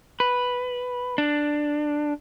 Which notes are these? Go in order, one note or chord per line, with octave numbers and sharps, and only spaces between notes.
B4
D4